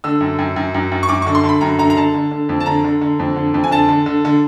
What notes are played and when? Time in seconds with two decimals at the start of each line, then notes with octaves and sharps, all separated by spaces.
0.04 D3 E6
0.21 F#2
0.39 F#2
0.56 F#2
0.74 F#2
0.92 F#2
1.03 C#6
1.09 F#2 D6
1.22 D3 C#6
1.35 C6
1.43 D3
1.49 B5
1.61 F#2 A#5
1.79 D3 A#5
1.90 A#5
1.97 D3 A5
2.14 D3
2.31 D3
2.49 F2
2.60 A5
2.66 D3 A#5
2.84 D3
3.01 D3
3.19 F2
3.36 D3
3.54 F2
3.64 G#5
3.71 D3 A5
3.89 D3
4.06 D3
4.25 D3